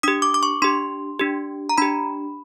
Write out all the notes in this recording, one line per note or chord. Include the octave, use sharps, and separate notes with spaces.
D4 G4 D#6
D6
D6
C#6
D4 G4 C6
D4 G4
A#5
D4 G4 B5